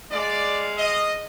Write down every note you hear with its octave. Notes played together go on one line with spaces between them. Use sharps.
G#3 D5 F5
D#5